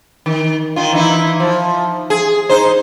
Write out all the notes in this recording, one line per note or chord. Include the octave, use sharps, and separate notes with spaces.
D#3
D#3 F4
E3 D#4 E4
F3
G#4
D#4 C5